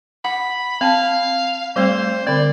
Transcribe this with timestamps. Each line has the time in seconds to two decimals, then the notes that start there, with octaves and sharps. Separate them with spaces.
0.25 F#5 B5
0.81 C4 F5 A5
1.76 G3 A3 C4 C5
2.27 D3 C4 D5